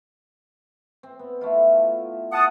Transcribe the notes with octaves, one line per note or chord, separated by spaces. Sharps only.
C4
B3
A3 E4 F4
F#5 A5 D#6